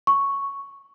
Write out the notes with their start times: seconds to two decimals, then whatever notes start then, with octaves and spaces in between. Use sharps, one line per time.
0.07 C#6